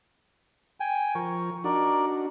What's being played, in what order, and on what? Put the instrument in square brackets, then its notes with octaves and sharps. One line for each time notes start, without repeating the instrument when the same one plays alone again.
[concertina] G5 G#5
[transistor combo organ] F3 A#4 [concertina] C#6
[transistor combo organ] D4 D#4 F#4 [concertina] A#4 D5